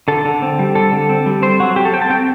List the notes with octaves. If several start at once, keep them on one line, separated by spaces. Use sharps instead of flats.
D3 A4
D3
C4
G3
D3 A4
D3
C4
G3
C4 C5
F#3 F#4
F#3 G4
A4
C4 G5
A5
C4 G5